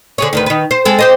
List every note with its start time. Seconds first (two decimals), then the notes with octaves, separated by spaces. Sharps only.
0.18 D3 G#4 C#5
0.33 D2 D#3 B4
0.46 D#3 B4
0.71 C5
0.85 G#3 C4 A4
0.99 G4 C5 D#5